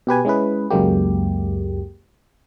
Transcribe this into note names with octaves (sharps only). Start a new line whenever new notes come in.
B2 G4 B4 G#5
G#3 C#4 E4 G#4 B4
C#2 F#2 F#3 G#3 A#3 G4